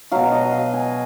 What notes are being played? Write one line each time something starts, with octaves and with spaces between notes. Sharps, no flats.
B2 F#3 F5
D#5
F5
G#5